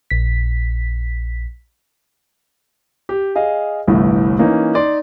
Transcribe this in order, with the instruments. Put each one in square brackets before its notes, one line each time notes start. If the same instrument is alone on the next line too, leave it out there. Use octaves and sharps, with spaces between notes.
[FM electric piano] A#1 B6
[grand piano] G4
G#4 D#5 F5
G1 C2 A2 E3
E3 A#3 C#4 D#4
D#4 D5 C6